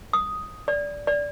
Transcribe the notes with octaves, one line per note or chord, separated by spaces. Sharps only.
D#6
D5
D5